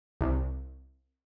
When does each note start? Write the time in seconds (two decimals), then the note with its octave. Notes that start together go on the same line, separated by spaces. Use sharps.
0.21 C2